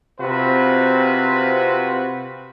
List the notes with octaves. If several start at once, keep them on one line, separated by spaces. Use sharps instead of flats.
C3 C4 F4 F#4 B4